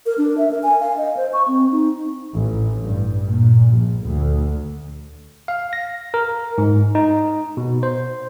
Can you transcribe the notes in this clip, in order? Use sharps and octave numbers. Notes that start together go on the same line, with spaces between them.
A#4
D4
E5
A#4
G#5
F5
D#5
C5
C#6
C4
D#4
A1
G2
A#2
A#1
D2
F5
A#6
A#4
G#2
D#4
B2
C5